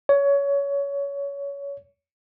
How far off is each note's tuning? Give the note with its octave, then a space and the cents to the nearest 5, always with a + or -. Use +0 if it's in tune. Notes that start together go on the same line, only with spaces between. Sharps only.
C#5 +20